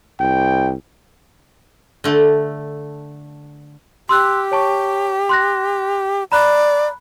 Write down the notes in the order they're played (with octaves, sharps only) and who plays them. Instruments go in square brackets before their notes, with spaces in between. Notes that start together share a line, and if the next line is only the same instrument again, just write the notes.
[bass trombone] C2 [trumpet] G5
[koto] D3 A3
[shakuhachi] G4 [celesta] C6 E6 F#6
[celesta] C#5 A5 C#6
C6 F#6 A#6
[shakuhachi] D5 [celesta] A#5 B5 F#6